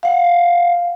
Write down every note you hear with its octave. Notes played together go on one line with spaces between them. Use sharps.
F5 F#5